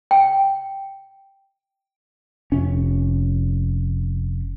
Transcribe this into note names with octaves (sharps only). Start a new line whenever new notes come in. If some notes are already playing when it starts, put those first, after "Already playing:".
G5
F1 C#4